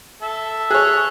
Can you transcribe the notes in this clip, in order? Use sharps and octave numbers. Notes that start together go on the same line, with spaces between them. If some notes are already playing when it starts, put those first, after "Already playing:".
A4 E5
G#4 C#5 F#6